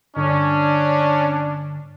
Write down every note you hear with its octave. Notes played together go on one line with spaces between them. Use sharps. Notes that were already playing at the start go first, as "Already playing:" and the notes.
G2 D3 C#4 D4